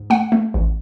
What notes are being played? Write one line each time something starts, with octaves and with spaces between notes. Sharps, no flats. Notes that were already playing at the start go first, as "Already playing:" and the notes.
Already playing: G#2
A3 F#5
A3
A1